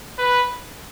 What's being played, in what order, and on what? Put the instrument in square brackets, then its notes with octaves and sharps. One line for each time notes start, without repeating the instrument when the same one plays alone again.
[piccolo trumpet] B4